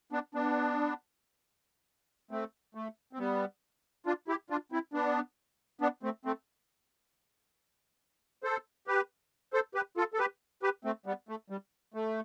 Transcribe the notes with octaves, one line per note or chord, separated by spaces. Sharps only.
B3 D4
B3 D4
A3 C4
A3
C4
G3 B3
D4 F4
E4 G4
D4 F4
C4 E4
B3 D4
B3 D4
A3 C4
A3 C4
A4 C5
G4 B4
A4 C5
G4 B4
F4 A4
A4
G4 B4
G4 B4
A3 C4
G3 B3
A3
G3
A3